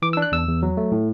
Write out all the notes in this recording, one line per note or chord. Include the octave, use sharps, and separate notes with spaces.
E3 D6
E6
D4
F#6
E2 E6
E2
F#3
A3
A2